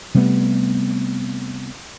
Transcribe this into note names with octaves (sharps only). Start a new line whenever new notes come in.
C3 G3 A3 B3